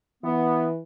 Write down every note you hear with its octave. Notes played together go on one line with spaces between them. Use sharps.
E3 B3